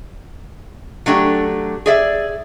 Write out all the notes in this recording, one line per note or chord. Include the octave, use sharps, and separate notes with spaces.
F#3 A3 D4 G4
G#4 D5 E5